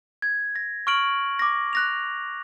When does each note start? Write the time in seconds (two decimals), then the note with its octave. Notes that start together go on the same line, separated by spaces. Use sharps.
0.22 G#6
0.56 A#6
0.87 C#6 F6 D7 F#7
1.39 D6 A#6
1.73 F#6 A#6 F7